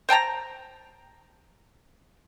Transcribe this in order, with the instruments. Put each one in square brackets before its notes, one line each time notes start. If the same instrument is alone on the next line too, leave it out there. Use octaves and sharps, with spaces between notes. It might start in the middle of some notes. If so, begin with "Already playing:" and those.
[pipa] C5 G5 A5 A#5